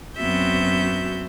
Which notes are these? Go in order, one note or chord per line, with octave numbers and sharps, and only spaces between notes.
F#2 B3 C4 F#4 E5 G6